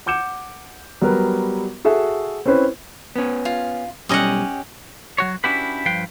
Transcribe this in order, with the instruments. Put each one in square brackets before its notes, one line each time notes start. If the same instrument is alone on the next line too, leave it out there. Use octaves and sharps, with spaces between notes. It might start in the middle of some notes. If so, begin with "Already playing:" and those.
[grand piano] F#5 D6 G6 C#7 E7
F#3 G3 B3 G4 A#4 B4
F#4 G#4 A4 E5
C4 C#4 E4 B4 C5
[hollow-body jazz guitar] B3 C#4
[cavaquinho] F4
[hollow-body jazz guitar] B1 G3 [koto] C#4 D#5 F#5 [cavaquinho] G4 D#6
[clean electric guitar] F#3 F#4 C#5
C#4 D4 E4 F#4 G4 B4
G2 F3 B4 F5 G5